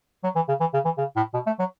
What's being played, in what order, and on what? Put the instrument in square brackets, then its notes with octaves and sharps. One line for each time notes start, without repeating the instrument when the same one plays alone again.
[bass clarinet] F#3
E3
C#3
E3
C#3
E3
C#3
A2
B2
A3
F#3